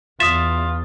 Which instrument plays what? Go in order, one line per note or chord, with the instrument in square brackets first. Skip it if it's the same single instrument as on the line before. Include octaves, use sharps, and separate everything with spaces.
[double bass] E2 [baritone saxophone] F4 [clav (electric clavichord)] E5 [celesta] D#6 A6